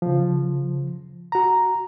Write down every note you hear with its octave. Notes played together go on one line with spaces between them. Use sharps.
C#3 F3
F#4 A#5